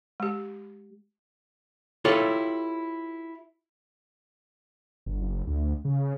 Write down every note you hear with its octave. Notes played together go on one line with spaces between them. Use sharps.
G#3 G4
E4 F4 G4 A4 C#5
G1
F#1
D2
C#3